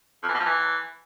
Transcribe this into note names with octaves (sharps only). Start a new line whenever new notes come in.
F2
E3
B2
F3
E3